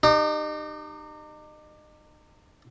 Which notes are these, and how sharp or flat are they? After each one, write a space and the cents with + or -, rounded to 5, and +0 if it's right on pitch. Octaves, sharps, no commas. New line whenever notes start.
D#4 -35 G4 +10